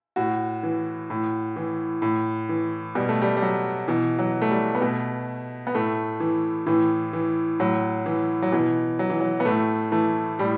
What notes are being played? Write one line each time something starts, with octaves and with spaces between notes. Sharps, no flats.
A2 F#4
E3
A2
E3
A2
E3
B2 G3
A3
G3
G3
F#3
B2 E3
F#3
A3
G3
B3
B2 A3
B3
A2 A3
E3
A2 E3
E3
A2 F#3
E3
F#3
B2 E3
F#3
E3
F#3
B3
A2 A3
E3 A3
A2 G3